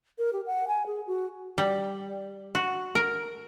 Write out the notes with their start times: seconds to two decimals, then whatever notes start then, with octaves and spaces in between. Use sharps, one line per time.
0.18 A#4
0.33 G4
0.46 F#5
0.68 G#5
0.86 G#4
1.07 F#4
1.58 G3
2.55 F#4
2.95 A#4